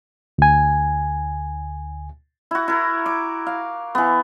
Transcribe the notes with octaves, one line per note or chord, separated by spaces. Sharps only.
D2 G#5
E4 F#4
E4 A#4
D6
F5
E3 B3